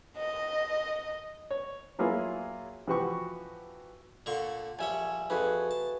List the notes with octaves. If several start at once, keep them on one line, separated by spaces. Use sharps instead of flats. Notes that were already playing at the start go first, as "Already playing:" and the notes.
D#5
C#5
F#3 A#3 E4 F4 G#4
E3 F3 F#4 G4 C#6
A#2 D3 C#6
A#1 G3 C#5 E5 G#5
F2 F#4 G#4 B4
A5